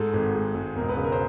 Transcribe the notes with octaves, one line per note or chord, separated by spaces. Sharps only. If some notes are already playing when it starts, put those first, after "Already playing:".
Already playing: G#2 A4
G#1
G#3
G#2
E1 A#4
B4
C#3
A#4
C5